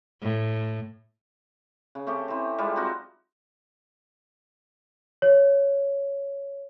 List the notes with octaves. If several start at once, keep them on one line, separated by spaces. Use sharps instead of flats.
A2
C#3
A3 C4 C#4 G4
E3 C4
G3 G#3 F4
C4 D#4 F4 F#4
C#5